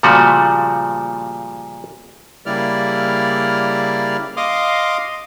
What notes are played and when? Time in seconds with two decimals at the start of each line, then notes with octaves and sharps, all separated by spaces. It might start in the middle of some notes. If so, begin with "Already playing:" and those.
0.03 A#2 C#3 F3 G3 A3 F#4
2.46 C#3 G3 A#3 E4 D5 F6
4.37 D#5 F5 C6 D6 D#6